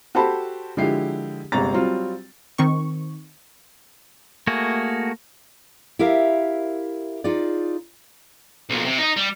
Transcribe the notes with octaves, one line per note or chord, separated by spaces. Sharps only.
F#4 G4 A4 C5 A5 B5
D3 F3 G#3 E4 G4 C7
G1 C3 G#3 C4 A#5 A6
F#3 G3 C4 F4
D#3 C4 C#6
A3 A#3 F#4 G#4
E4 G4 A#4 E5 F5
D#4 F4 G#4 D5
B1 A#2
C3
D#4 D#5
G3